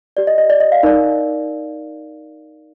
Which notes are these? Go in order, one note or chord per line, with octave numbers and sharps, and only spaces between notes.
G4 D5
D#5
D#5
D5
D#5
F5
D#4 A#4 D5